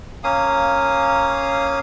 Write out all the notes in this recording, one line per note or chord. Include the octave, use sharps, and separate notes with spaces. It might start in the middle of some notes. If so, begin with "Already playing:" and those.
A#3 C#4 F5 D#6